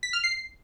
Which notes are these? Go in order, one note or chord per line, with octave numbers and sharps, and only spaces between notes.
B6
F6
C7